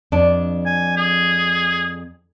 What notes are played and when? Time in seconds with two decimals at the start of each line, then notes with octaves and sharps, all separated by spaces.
0.12 F2 D4 D5
0.66 G#5
0.97 G#4